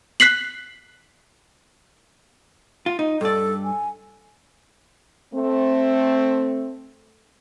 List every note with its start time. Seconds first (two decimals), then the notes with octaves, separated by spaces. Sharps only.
0.20 F#6 B6 C7 F#7
2.86 F4
2.99 D#4
3.21 G2 A4 D5
3.64 G#5
5.34 A3 C4